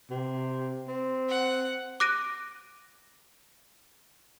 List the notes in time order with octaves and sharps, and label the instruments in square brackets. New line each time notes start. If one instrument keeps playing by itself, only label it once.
[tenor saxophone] C3
C4
[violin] F#5
[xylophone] D6 F#6 A#6 D7 D#7